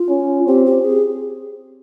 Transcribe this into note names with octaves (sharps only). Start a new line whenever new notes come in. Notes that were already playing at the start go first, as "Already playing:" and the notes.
Already playing: F4
C#4
C4 G4
G4
G#4